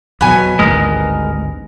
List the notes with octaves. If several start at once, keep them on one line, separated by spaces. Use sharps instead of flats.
E2 B2 F#3 B3 G#5
G#1 D2 G2 G#3 A#4